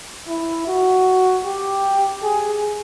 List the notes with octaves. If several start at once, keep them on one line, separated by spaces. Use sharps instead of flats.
E4
F#4
G4
G#4